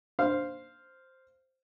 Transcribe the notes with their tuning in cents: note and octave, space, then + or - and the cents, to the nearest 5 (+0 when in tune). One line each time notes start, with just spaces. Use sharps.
C5 +0 F5 -5